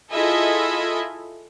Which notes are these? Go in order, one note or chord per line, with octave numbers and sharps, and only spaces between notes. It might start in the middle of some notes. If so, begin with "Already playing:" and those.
E4 F4 G#4 A4 D#5 E5